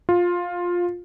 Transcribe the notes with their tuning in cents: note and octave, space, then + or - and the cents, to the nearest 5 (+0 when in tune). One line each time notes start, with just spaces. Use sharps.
F4 +10